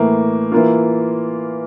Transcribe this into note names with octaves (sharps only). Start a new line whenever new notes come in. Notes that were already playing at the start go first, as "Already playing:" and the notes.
Already playing: A2 E3 A#3
E3 A#3 F4